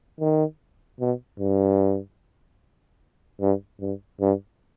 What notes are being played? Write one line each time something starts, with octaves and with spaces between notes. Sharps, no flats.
D#3
B2
G2
G2
G2
G2